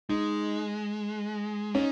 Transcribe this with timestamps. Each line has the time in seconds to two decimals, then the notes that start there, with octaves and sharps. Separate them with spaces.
0.09 G#3 D#4
1.75 C#4 D#4